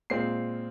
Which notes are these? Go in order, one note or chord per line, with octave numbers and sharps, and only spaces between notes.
A#2 G#3 C4 F4 C7